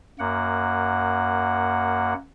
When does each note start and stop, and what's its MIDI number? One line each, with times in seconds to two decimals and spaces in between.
0.19 2.14 42
0.19 2.14 58
0.19 2.14 78